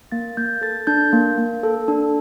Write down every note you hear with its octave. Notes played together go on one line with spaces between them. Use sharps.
A#3 A6
A#3 G6
A4 A6
D4 G6
A#3
A#3
A4
D4